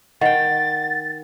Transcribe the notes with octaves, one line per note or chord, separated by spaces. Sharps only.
D#3 F#5 G5 A6